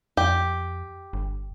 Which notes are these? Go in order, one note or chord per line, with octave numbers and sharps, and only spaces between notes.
F2 G4
G1